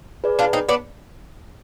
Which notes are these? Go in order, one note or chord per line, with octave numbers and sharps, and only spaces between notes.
G#4 B4 D5
D4 F4
C4 D#4
B3 D4